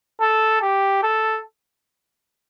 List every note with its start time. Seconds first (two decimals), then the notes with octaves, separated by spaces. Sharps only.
0.21 A4
0.62 G4
1.03 A4